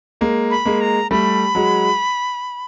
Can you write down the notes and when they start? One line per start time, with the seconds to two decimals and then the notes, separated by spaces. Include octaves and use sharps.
0.21 G#3 A#3
0.51 B5
0.66 G#3 A#3
0.81 A#5
1.11 G3 A3 B5
1.55 F#3 G#3